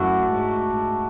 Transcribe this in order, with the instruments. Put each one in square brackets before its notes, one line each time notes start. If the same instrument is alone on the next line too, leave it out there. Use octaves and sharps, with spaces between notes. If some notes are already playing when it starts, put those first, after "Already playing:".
Already playing: [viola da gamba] F#2 [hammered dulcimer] A3 D4 F#4
[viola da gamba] G#2
G#2